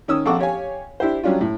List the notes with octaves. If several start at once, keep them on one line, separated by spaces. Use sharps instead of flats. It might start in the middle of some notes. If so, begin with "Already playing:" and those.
D#3 C#4 D#6 E6
A#1 C4 A4 F#5 C#6 D6
G4 C#5 F5 G#5
D4 E4 G4 C5
F#3 G3 C#4 D4 F4
A2